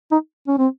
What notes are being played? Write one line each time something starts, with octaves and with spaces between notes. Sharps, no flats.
D#4
C#4
C4